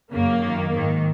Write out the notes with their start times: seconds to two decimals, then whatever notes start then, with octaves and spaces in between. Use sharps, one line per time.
0.12 F#2 C#3 A#3
0.42 F#2 D#3
0.71 G#2 D#3